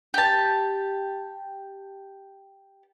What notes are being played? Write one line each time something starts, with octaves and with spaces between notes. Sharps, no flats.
G4 A5